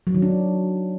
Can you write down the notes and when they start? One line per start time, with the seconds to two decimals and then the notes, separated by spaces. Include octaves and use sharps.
0.07 F#3
0.15 D#3
0.22 D4